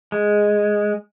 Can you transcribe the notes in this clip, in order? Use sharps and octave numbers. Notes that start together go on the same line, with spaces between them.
G#3